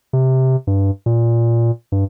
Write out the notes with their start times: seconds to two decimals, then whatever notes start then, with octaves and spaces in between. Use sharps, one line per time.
0.13 C3
0.67 G2
1.06 A#2
1.92 G2